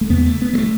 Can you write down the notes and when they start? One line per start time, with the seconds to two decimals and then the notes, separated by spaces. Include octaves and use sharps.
0.01 A3
0.10 E2 C#3 B3
0.26 A3
0.42 B3
0.53 F#3
0.58 C#3 A3